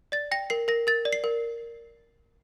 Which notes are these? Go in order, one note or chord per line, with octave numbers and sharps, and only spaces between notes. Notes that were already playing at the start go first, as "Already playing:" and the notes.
D5 A6
G5 A#6
A#4 C7
A#4 A#6
A#4 A6
D5
C7
A#4